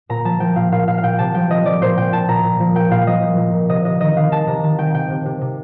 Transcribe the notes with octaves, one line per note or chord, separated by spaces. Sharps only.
A#2 A#5
F3 A5
F3 G5
A#2 F5
A#2 F5
A#2 F5
F5
A#2 G5
C3 A5
F3 G5
F3 D#5
F3 D5
A#2 C5
A#2 G5
A#2 A5
A#2 A#5
A#2
F3
A#2 G5
A#2 F5
F3 D#5
F3
A#2
A#2
C3 D#5
C3 D#5
D#3 D#5
D#3 F5
D#3 A5
C3 A#5
D#3 A5
D#3 G5
C3 G5
C3
C3
C3